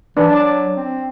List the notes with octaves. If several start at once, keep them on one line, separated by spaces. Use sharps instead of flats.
E3 D4 B4
F#3 D5 A5
C4